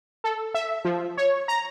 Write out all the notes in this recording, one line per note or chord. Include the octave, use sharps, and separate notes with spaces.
A4
E5
F3
C#5
A#5